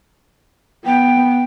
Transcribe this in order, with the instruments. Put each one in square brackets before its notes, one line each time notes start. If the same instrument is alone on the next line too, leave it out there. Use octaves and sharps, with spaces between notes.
[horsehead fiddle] B3 [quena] G5